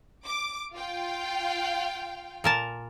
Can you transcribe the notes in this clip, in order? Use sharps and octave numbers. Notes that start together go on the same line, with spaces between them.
D6
F4 F5 G5
A#2 A#4 A5